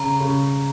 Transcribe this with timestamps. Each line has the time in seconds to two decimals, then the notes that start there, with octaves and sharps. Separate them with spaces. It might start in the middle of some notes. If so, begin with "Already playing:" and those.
Already playing: C#3 A#5
0.20 C#3